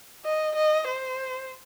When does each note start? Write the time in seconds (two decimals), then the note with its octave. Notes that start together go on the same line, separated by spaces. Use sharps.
0.24 D#5
0.56 D#5
0.88 C5